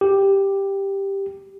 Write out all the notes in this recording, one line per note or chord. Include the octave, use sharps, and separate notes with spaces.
G4